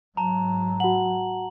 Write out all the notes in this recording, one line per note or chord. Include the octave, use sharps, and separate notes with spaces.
G#2 F#3 A5 A#5
F#4 F#5 F#7